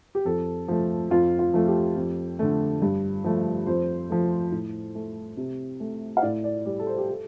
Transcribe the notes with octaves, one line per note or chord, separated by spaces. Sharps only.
G4
F2 A4
F3 A3
F2 F4
F4
F3 A3
G4
F2
D3 A3
G2
F3 A3
F2 C5
F3 A3
A2
A3
C3
A3
F5
A2 D5
D5
G3 D5
A4
C5
G4
A4